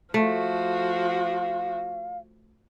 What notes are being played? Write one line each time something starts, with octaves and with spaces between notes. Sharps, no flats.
F3 A3 F#4 F5